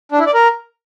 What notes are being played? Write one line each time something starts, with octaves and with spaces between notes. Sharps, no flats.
D4
E4
D5
A#4